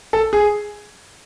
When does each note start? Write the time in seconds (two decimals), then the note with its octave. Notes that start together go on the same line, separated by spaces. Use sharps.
0.13 A4
0.33 G#4